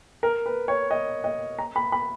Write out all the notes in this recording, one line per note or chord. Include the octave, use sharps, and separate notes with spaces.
A#4
B4
C#5
D#5
D#5
A#5
B5
B5